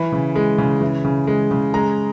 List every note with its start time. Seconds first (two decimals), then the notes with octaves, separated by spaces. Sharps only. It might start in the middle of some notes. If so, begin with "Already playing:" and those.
Already playing: E3 B5
0.12 C#3
0.35 G#3
0.58 C#3
0.81 E3
1.04 C#3
1.27 G#3
1.51 C#3
1.74 G#3 A#5